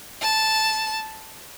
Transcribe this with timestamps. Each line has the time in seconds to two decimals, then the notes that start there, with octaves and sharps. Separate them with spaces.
0.22 A5